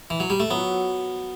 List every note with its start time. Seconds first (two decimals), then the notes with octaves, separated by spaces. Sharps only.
0.10 E3
0.20 F#3
0.30 G3
0.40 A3
0.50 F#3 B3